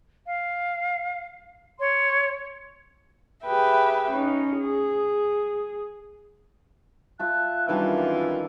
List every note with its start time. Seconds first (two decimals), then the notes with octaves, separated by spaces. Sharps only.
0.25 F5
1.79 C#5 C6
3.44 G4 G#4 B4 E5 G5
4.11 C#4 D#4
4.59 G#4
7.19 F4 E5 A5 F#6
7.68 F#2 D#3 E3 G3 D4 F4